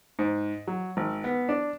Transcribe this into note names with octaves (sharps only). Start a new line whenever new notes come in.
G#2
F#3
G#1
B3
D4